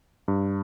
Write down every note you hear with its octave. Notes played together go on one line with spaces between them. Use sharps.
G2